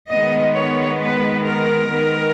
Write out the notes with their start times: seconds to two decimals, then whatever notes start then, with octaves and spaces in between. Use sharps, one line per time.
0.11 D#3 G#3 B3 D#5
0.56 C#5
1.01 B4
1.46 A#4
1.92 D#3 G#3 B3